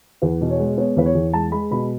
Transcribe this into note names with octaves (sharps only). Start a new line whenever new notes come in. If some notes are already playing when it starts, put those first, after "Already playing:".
E2 B4
B2
C#5
G#3
B3 C#5
E2 B4
C#5
E2
G#3 A5
G#3 B5
B2 B5